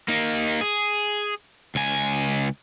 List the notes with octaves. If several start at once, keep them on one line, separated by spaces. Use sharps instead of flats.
A#3 D#4
G#4
C#2 G#5